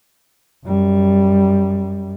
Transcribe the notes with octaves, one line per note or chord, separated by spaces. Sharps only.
F#2 G3